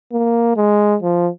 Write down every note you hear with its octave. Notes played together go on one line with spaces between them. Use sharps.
A#3
G#3
F3